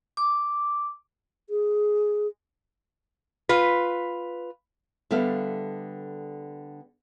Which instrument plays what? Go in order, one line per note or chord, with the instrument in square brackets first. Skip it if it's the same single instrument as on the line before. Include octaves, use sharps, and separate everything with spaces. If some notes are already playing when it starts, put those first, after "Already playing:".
[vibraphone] D6
[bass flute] G#4
[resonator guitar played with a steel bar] F4 B4
[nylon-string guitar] D3 G3 B3 A4 E5 F5